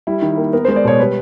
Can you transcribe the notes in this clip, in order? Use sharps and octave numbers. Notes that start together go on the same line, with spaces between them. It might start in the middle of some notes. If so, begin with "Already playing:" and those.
G3 E4
D#3
A#3
B3 A#4
G#3 C5
D5
B2 C#5
G3 B4